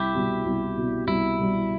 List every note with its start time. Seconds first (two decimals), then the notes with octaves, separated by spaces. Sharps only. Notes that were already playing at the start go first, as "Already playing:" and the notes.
Already playing: C2 E4 G4
0.15 B2 G3
0.45 C2
0.77 B2 G3
1.07 C2 E4
1.39 B2 G3